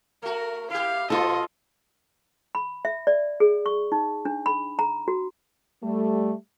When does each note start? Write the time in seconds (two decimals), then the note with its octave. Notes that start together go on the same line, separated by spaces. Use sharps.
0.22 A3 F#4 A#4
0.70 E4 G4 F5
1.10 A#2 F3 F4 A4 D#5
2.55 B5
2.85 E5
3.07 D5
3.40 G#4
3.66 C#6
3.92 D#4
4.25 D4
4.46 B5
4.79 A#5
5.08 F#4
5.83 G3 A3